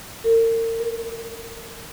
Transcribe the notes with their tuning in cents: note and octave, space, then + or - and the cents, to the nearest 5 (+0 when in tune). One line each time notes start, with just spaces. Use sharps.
A#4 -40
A#4 +20